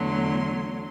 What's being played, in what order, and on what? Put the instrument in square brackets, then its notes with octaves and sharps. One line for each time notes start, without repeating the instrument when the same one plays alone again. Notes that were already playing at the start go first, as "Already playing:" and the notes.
Already playing: [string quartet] E2 D3 F#3 A3 C6